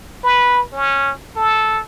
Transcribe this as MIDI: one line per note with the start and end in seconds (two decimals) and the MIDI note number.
0.23 0.63 71
0.73 1.11 61
1.36 1.81 69